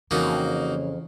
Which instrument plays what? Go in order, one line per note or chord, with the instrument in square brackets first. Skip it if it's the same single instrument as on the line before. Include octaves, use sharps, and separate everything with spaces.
[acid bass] F2 [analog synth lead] C#3 [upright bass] E3 [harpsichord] A#3 D#4 F#4